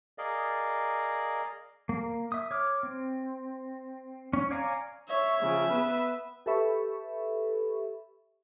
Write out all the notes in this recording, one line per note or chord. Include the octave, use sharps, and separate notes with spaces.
G#4 A#4 D5 D#5 F5
A#3
E5 D#6
C#5 D6 F6
C4
C#4
C#5 D5 F5 G#5 A#5
C#5 E5
C#3 F3
B3 B4 E6
G4 A4 B4 E5 B5 C#6